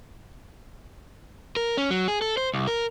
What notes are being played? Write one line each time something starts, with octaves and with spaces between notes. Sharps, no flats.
A#4
C#4
F#3
G#4
A4
C5
C2
A#4